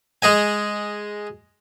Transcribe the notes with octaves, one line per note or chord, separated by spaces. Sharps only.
G#3 G#4 D#5 G#5